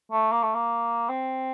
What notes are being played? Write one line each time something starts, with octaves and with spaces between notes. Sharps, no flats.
A3
A#3
A3
A#3
C4